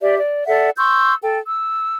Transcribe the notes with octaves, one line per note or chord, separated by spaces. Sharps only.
G4 D5 E5
D5
A4 D5 E5 F#5
C6 C#6 E6 G6
A4 G5
E6